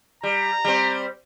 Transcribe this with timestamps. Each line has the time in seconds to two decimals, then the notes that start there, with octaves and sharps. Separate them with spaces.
0.23 G3 A#5
0.64 G3 C4